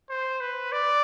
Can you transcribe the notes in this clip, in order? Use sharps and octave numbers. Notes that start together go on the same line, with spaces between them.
C5
B4
D5